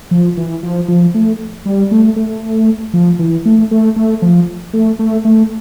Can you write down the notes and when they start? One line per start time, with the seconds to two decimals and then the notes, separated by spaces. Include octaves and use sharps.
0.11 F3
0.37 E3
0.63 F3
0.88 F3
1.14 A3
1.65 G3
1.91 A3
2.16 A3
2.94 F3
3.19 E3
3.45 A3
3.71 A3
3.96 A3
4.22 F3
4.73 A3
4.99 A3
5.25 A3